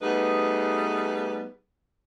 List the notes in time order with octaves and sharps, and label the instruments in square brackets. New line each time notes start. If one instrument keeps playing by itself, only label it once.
[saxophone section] G3 A3 B3 D#4 G#4 B4